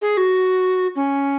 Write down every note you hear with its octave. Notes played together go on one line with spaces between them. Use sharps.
G#4
F#4
C#4